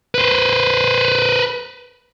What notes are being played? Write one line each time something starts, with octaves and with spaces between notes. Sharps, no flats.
B4 C5